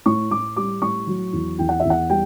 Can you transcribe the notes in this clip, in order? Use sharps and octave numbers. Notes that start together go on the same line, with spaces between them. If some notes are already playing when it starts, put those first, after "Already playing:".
A2 C#6
A2 D6
G3 D6
A2 C#6
F#3
E2
E2 G5
F#5
E2 E5
F#5
G3 G5